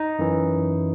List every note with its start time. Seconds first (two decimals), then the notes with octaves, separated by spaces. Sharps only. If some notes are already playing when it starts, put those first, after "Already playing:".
Already playing: D#4
0.19 F#2 E3